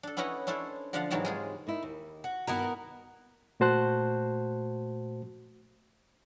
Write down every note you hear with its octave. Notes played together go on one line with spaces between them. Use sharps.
D4 A4
B3 C#4 E4 B4 D#5 F#5
C#4 D4 E4 A4 C5
D3 F3 D4 F4 F5 F#5
G#2 C3 E3 F#3 D#4 A5
G#3 F4 G#4
A#3 D#4 E4
D#2
F#4
G2 D#3 B3 E4 F#4 A#4
A#2 A3 F#4 C5 A5 F#6